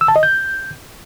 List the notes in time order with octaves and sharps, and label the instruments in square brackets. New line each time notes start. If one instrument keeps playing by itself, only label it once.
[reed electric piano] E6
A5
D#5
G6